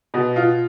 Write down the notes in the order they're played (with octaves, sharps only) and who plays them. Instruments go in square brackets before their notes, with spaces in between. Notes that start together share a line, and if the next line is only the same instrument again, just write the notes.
[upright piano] B2
F4